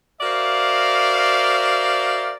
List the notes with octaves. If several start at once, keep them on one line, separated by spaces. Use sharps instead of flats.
F#4 A#4 C5 D5 E5 F5